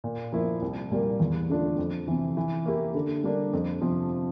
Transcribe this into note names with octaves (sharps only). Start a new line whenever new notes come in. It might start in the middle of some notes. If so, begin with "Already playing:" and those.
A#2
F3 A#3 E4
C2
A#2 G3 A#3
E2
D3 A3 D4 F4
F2
C3 E3
E3
A#3 E4 G4
D3
G3 A#3 D4
F2
C3 F3